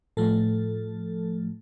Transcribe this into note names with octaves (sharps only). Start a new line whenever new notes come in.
A2 F3 A3 A4